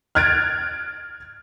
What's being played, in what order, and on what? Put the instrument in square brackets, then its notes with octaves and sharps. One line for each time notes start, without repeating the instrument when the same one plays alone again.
[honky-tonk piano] F6 F#6 G#6 A6 D7